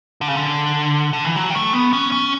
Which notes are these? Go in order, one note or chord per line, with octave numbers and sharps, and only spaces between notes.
D3
C#3
D3
D3
E3
F#3
G3
A3
B3
C#4
C#4